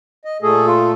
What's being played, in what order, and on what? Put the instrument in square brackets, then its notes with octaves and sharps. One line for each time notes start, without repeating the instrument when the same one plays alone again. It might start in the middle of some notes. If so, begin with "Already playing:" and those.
[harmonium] D#5
[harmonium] A#2 A3 A4 [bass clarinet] G#4
[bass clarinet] F4